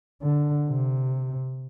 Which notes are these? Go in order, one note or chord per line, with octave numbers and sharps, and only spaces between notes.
D3
C3